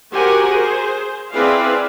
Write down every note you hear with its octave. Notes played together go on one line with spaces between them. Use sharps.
F#4 G4 A#4 C5 F#5 G#5
G#4 C5
C4 E4 G#4 B4 D5 F5